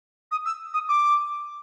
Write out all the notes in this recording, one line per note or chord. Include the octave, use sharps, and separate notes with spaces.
D#6
E6
D#6
D6